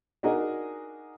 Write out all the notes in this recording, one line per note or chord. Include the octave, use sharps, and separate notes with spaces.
D4 D#4 F#4 G#4 A#4 D#5